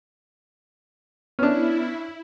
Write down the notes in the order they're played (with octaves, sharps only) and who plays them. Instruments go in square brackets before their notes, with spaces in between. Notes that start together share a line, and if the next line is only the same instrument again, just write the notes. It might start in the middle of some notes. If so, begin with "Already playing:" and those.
[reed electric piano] B3 F6 [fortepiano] C#4 D4 [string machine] E4